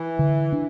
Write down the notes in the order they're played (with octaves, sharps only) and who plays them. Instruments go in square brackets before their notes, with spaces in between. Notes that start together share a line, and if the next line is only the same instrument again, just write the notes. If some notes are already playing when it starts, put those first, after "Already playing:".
Already playing: [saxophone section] E3
[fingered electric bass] D3
D4